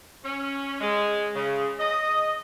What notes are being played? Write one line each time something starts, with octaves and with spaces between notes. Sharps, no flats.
C#4
G#3
C#3
D#5